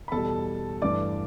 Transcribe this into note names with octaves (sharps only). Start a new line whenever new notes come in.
B5
E2 B2 G3 A4 A5
G2 E3 A3 D5 D6